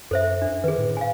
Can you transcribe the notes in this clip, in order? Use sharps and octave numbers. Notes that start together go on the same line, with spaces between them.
F#2 A4 C5 E5
D4
D#3 G#4 B4
A2
F5 G#5